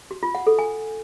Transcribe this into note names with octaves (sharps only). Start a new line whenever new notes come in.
F#4
F4
F#5
A4
G#5